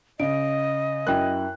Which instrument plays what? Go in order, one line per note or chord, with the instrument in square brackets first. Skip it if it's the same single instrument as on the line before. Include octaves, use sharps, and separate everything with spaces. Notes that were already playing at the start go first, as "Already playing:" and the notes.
[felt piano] C#3 [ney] D#5 [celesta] D7
[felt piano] F#2 E4 F#6 [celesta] A#4 G5